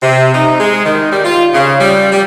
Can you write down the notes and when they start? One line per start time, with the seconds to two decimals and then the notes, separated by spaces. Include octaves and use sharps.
0.01 C3
0.32 D#4
0.59 G#3
0.84 D#3
1.11 G3
1.24 F4
1.54 C#3
1.79 G3
2.11 G3